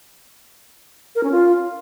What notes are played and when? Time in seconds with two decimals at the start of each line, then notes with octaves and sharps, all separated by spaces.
1.15 A#4
1.24 C#4
1.32 F4